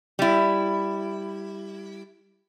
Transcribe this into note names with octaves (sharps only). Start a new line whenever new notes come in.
G3 E4